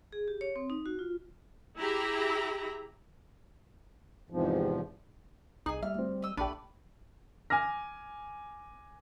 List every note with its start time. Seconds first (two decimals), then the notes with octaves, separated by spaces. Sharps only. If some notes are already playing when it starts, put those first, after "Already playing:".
0.12 G#4
0.28 G4
0.41 C#5
0.56 C4
0.70 D#4
0.86 F#4
0.99 F4
1.78 E4 G4 G#4 E5 A#5 B5
4.30 E2 G#2 C3 F3
5.66 C2 D#4 G#4 G#5
5.83 G3 E5 F6
5.94 D2 C4
6.22 D#5 E6
6.37 A#1 A3 D4 G4 B4 D5 A5
7.50 G#5 D6 F6 A#6